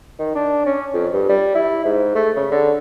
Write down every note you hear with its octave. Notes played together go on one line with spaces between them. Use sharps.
D#3
D4
C#4
F2
G2
G3
E4
G#2
A3
C#3
D3